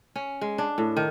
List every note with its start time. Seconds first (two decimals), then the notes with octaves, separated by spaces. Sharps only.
0.16 C#4
0.41 G#3
0.58 D4
0.78 A2
0.97 D#3